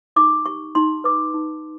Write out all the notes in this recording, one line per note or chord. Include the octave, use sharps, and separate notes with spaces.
D#4 D6
G4 C#6
D#4 C6
B4 D6
D#4